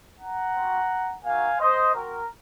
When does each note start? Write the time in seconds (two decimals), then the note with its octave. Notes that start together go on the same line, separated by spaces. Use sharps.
0.20 F#5 A#5
0.55 C4 F#4
1.25 A#3 D#4 F#4 F5 G#5
1.60 C5 D#5
1.95 C4 F#4 A#4